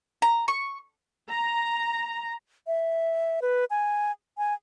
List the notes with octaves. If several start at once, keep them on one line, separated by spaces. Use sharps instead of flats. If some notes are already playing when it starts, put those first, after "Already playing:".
A#5
C#6
A#5
E5
B4
G#5
G#5